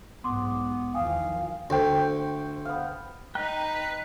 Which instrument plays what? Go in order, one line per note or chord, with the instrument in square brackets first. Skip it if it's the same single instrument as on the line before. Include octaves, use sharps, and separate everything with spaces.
[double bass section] B1 G#2 [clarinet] B3 [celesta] C6 D6
[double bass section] E2 D#3 F3 [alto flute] F5 [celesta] G5 G#5 D#6
[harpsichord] D2 [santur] C5 G5
[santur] B3 F5
[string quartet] D#4 [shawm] B4 [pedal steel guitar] G5 A#5 F#6